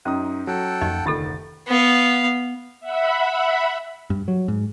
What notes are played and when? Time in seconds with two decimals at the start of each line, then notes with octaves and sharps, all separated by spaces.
0.05 F#2 C#4 D#4 D#6
0.47 F#3 A4 F#5 G5
0.81 F2 F3 A#3 D#4 G4 D#5
1.06 F1 D2 D#3 F4 G4 A4 A#4 A6
1.67 B3 F5
2.80 E5 F#5 B5
4.10 G2
4.28 F#3
4.48 G#2